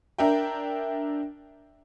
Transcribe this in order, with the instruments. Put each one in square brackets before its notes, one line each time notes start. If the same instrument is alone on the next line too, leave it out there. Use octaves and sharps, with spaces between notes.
[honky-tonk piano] D4 A#4 E5 G5